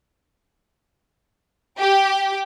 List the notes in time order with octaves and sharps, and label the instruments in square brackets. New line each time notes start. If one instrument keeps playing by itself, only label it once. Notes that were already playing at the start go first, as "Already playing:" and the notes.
[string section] G4